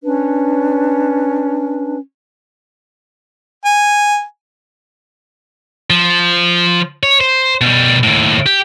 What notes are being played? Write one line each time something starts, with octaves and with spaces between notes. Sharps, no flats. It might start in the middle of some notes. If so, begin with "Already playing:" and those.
C#4 D4 B4
G#5
F3
C#5
C5
B2 G3
D#2 A2
G4